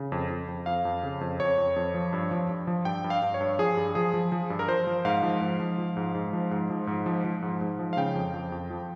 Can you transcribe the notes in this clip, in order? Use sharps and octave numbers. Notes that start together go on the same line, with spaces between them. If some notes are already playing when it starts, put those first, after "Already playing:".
Already playing: C#3
F2
F2
F2
F2 F5
F2
C#3
F2
F2 C#5
F2
F2
F3
G2
F3
G2
F3
G2 G5
G2
F5
G2
C#5
G2
F3 G#4
G2
F3 G#4
F3
F3
G2
A#4
F3 C5
F3
G#2 F5
F3
G#2
F3
F3
G#2
G#2
F3
G#2
F3
G#2
F3
F3
G#2
G#2
F3
F5
C#3 G5
F2
F2
F2
F3